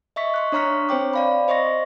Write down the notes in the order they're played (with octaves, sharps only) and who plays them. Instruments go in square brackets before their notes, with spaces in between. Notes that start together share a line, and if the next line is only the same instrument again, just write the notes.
[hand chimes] D#5 E5 C#6 B6
C6 C#6 F#6
D4 C#5 A#5 C#6 F6 B6
C4 C5 C#5 G5 D6
D5 F5 B5
C5 D#5 C6 C#6 A#6